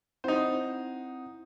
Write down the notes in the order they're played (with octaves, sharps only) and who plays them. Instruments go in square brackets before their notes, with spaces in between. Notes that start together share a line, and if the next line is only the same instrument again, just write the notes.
[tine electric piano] C4 E4 F#5 [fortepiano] D#4 C5